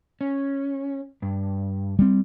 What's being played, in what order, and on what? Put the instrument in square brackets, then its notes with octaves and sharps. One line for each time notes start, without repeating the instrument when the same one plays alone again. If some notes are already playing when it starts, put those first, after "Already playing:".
[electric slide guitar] C#4
G2
[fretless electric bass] G3 C4